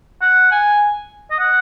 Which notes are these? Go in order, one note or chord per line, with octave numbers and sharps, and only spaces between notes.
F#5
G#5
D#5
F#5